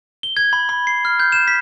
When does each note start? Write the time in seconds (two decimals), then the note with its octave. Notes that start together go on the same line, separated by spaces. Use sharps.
0.23 G7
0.37 G#6
0.53 B5
0.69 B5
0.87 C7
1.05 F6
1.20 G6
1.32 E7
1.48 B6